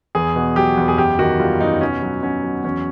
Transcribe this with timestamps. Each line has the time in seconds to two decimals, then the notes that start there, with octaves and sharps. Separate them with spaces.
0.15 E2 G#4
0.36 B2
0.56 F#3 G4
0.77 E2
0.88 G#4
0.98 F#2 G4
1.19 D#3 F#4
1.40 G3 F4
1.60 F#2 D#4
1.81 B2 C#4
2.02 F#3
2.23 B2 C#4
2.43 F#3
2.64 E2 C#4